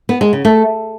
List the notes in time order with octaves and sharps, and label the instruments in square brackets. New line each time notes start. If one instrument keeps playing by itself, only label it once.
[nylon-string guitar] B3
G#3
C#3
A3